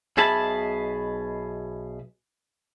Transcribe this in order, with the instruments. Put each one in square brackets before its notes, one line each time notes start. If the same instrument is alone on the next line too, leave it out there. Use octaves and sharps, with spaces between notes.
[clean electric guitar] B1 B2 G#4 E5 A5 B5